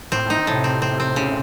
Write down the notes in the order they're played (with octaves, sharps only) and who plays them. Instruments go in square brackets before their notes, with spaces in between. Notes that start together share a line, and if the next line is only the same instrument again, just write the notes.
[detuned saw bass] A2 [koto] C4
[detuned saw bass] A2 [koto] D#4
[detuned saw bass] D#3
[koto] A2 [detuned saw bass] C3
[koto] C4
C4
C4
C#3